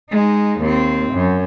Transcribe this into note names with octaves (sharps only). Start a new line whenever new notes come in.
G#3 D#4
D#2 C4
F#2